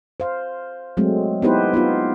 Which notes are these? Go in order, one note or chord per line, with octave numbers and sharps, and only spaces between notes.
C5 F5
F#3 G#3 A3 C4
B3 D#4 E4 G4 B4 C5
B3 D#4 F4